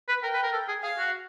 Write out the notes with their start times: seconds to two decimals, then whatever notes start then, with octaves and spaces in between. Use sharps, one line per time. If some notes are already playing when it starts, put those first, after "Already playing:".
0.09 B4
0.23 A#4 G5
0.34 B4
0.43 A#4
0.52 A4
0.68 G#4
0.83 G#4 F5
0.98 F#4